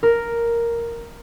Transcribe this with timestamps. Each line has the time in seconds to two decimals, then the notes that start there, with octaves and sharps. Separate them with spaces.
0.03 A#4